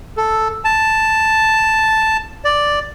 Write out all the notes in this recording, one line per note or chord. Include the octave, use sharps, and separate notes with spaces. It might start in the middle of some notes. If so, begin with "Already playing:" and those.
A4
A5
D5